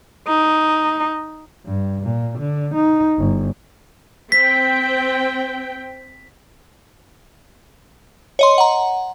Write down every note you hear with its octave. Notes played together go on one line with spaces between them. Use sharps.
D#4
G2
A#2
D3
D#4
G1
C4 G5 B6
C#5 D#5 C6
F#5 A#5